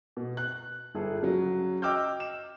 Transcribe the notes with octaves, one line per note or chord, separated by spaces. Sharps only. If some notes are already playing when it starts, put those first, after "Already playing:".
B2
F#6
G1 G#4 A4
C#3 F#3
D#5 G5 D6 E6 F6 G6
E7